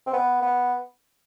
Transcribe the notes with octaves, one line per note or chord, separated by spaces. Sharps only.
C4
B3
B3